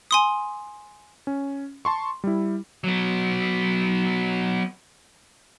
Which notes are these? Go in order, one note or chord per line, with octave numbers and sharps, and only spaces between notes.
G#5 C6 D#6
C#4
A5 C6 C#6
G3 E4
F#3 B3